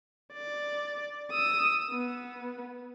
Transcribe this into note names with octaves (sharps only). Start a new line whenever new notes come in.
D5
D#6 E6
B3